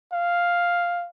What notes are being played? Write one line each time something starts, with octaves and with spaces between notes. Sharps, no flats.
F5